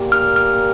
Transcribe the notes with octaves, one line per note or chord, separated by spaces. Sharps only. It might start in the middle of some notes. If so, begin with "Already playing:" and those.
Already playing: A#2 A#3 G4
F6
F6